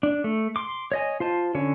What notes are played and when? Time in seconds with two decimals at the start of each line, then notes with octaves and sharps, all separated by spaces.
0.03 D4
0.24 A3
0.56 C6 D6
0.92 C#5 D#5 G#5
1.20 F4 C5 A5
1.55 D3 C#4 C#5